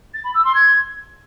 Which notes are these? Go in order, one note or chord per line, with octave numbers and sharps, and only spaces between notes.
A6
B5
E6
C6
G#6